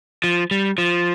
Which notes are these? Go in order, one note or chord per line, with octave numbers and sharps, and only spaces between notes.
F3
G3
F3